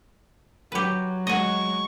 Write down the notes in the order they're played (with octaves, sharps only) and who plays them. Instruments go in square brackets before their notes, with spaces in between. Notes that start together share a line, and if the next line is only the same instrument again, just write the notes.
[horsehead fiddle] F#3 [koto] G4 B4
[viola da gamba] G#3 [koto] F#4 D#5 [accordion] C#6